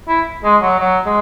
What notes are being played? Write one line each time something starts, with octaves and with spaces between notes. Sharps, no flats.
E4
G#3
F#3
F#3
G#3